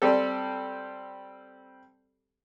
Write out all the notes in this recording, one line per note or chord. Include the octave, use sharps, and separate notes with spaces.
G3 C4 G4 A4